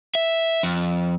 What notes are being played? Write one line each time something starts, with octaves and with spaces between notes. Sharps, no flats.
E5
F2